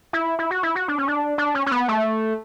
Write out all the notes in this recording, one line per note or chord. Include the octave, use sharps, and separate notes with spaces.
E4
E4
F#4
E4
F#4
D4
C#4
D4
D4
C#4
C#4
B3
A3